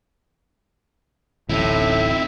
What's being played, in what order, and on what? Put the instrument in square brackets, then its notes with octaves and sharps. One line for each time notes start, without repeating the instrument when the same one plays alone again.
[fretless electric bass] D1 A1 [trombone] A2 [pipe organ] C4 E5 E6 [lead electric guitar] D#4 E4